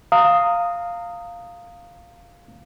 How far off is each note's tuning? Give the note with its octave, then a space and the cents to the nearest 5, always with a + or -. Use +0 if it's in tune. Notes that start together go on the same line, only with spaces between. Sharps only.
F5 +0 A#5 -25 D#6 +0